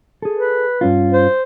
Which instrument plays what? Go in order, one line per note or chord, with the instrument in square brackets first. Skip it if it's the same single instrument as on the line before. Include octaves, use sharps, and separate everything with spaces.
[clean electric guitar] G#4 A4
[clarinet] B4
[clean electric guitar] G2 C#4 F4
[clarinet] C5